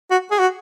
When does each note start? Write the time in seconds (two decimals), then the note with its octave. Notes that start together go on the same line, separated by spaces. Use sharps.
0.11 F#4
0.31 G#4
0.39 F#4